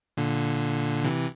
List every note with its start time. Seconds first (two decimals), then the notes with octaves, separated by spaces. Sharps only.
0.17 A#2 D3
1.04 C3 E3